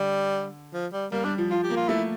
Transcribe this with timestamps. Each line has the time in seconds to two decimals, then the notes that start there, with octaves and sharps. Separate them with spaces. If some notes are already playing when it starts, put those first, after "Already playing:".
Already playing: D3 G3
0.73 F3
0.93 G3
1.12 G3 A#3
1.24 G3 D4
1.38 F3
1.51 F3 F4
1.63 G4
1.70 A#3
1.77 F4
1.89 A3 E4